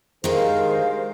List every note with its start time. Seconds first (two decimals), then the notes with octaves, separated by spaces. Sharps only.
0.24 D3 D#3 G#3 G4 G#4 A#4 C5 F5